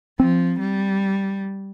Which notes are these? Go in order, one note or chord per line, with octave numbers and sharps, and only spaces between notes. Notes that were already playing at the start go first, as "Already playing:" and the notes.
F3 C4
G3